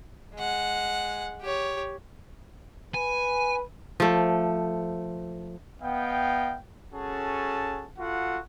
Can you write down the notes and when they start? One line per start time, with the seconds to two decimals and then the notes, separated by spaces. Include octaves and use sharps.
0.34 G#3 F#5
1.41 G4 C#5
2.94 B4 G#5
4.00 F3 A3
5.82 B3 D#5 F5 G5
6.94 C#4 F#4 G#4 A4 A5
7.99 F4 F#4 A4 F#5